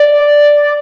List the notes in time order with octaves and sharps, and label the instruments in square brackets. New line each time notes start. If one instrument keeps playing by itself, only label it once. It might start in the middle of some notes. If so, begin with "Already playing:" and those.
Already playing: [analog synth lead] D5